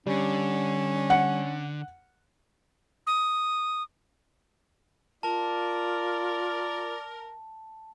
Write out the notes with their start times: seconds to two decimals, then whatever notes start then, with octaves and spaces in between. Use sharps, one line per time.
0.06 D3 G3 C#4
1.10 F#5 C#7
3.07 D#6
5.23 F4 A#4 D5 A5